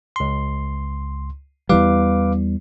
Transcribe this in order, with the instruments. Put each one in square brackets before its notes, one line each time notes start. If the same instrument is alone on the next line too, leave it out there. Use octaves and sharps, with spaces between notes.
[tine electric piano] C#2 C6
[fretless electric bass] E2 E3 G3 [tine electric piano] B4 F5 D6